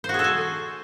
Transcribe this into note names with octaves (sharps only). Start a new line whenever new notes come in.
C5
F#4
G#4
A4
G#5